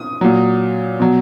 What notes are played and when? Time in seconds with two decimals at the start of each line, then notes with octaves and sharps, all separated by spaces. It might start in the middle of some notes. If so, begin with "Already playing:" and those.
Already playing: D#6
0.21 A#2 F#3
1.00 B2 F#3